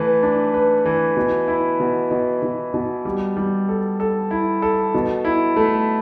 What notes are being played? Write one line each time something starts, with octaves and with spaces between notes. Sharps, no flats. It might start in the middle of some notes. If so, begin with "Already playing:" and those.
Already playing: E3 A3 B4
D4
B4
E3
B2
E4
B2
B2
B2
B2
G3
G3
A4
A4
E4
A4
B2
E4
A3